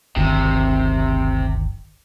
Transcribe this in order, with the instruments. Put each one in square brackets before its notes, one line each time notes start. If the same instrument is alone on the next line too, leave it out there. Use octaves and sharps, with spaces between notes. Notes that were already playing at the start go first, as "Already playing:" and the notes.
[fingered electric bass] D1 G1 D#3 [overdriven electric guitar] C3